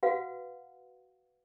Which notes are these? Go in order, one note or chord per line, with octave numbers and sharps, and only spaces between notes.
F#4 B4 F5 F#5